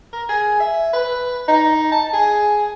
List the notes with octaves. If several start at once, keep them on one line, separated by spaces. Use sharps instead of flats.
A#4
G#4
E5
B4
D#4
A5
G#4